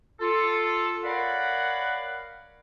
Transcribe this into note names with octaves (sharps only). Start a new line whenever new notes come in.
F4 A4
A#4 C#5 D5 F5 F#5 B5